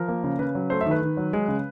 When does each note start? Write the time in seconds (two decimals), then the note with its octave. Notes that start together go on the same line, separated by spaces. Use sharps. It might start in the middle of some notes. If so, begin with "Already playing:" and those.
Already playing: F3 A#4
0.08 A#3
0.24 C#3
0.39 C#3 B4
0.55 F#3
0.70 A3 C5
0.81 D#3 E5
0.91 B4
1.02 D#3
1.17 F#3
1.33 G#3
1.48 C#3